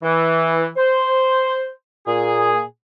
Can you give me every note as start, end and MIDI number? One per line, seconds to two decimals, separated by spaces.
0.02 0.66 52
0.77 1.69 72
2.07 2.61 46
2.07 2.61 68